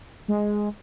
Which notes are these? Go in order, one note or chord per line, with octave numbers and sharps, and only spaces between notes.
G#3